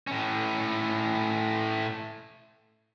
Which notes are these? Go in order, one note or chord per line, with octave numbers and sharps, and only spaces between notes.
A2 C#4